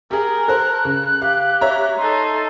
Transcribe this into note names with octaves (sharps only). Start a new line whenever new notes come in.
G4 G#4 A#4
A4 C5 F#6
C#3
G4 F5
C#5 E5 A#5
D#4 A4 C6